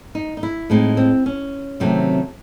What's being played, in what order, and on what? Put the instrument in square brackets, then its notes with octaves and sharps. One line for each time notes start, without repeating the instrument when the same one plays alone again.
[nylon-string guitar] D#4
D#4
E4
A2 G#3 C4 D#4
C4
C#4
C3 D#3 F#3 A3 C4